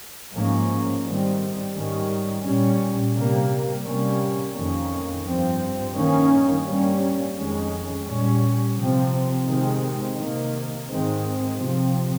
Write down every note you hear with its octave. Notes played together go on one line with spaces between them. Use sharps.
G#2 F3 A#3 C#4
G#2 D#3 G3 C4
G#2 D#3 G3 C#4
A#2 G3 C#4
C3 G3 A#3
C3 G3 A#3 C#4
F2 D#3 A#3 C#4
G2 F3 C4
G2 D#3 A#3 C#4
G2 G3 A#3 C#4
F2 D#3 G#3 C#4
A#2 G3 C#4
C3 F3 C4
C3 D#3 G#3 C4
C3 D#3 A#3
G#2 D#3 G#3 C4
C3 F3 C4